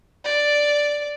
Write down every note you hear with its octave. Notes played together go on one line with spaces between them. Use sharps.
D5